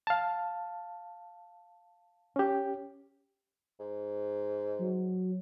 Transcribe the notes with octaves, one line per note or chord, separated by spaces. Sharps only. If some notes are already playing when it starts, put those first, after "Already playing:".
F5 A5
C#4 G4
G#2
F#3